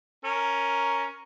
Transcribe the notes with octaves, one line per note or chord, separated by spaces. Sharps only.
C#4 A#4